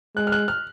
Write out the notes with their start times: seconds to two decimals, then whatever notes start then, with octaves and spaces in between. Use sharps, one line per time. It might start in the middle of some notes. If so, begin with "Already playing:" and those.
0.16 G#3 F#6
0.27 F6
0.32 F#6
0.48 F6